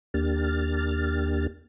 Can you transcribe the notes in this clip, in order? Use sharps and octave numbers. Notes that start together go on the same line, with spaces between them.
D#2 A#3 D4 G4 F6 A6